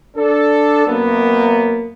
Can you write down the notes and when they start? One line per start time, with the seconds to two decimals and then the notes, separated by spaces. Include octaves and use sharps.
0.16 D4 A4
0.87 F#2 A#3 B3